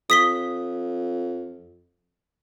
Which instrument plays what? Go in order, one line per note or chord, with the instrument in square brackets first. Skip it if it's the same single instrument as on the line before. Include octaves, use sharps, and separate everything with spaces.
[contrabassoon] F2 [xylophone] D#6 B6 G7